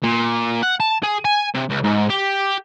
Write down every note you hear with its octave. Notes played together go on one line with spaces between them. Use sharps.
A#2
F#5
A5
G#4
G#5
C3
C#2
G#2
G4